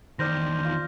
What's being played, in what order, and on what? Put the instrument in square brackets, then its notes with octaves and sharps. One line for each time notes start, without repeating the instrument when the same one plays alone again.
[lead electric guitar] E2 D#3 [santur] C5 D5 [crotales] F6 G6 A#6
[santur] F4 F5